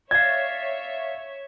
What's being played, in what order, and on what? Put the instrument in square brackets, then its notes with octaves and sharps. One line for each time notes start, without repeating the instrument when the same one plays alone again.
[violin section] C#5 E5 [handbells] D5 F5 [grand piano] G#6